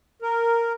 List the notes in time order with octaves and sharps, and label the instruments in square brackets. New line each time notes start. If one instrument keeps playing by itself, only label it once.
[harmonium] A#4